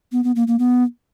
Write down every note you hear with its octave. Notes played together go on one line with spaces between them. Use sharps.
B3
B3
A#3
A#3
B3